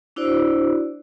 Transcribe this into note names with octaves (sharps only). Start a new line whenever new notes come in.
D4 E4 F#4 C5 D5